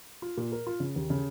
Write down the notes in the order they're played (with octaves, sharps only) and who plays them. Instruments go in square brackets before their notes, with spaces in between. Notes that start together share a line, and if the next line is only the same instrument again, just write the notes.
[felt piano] F4
A#2
A#4
F4
C#3
D#2
C#3